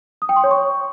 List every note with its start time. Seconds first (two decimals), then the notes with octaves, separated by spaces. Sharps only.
0.22 D#6
0.29 G5
0.36 C6
0.44 C#5
0.51 C#6